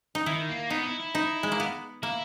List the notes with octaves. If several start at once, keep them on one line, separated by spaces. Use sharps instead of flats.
D#4
D#3 E4
A#3
B3 D#4
E4
E4
D#4
G#3
A#3
B3
A#3 E4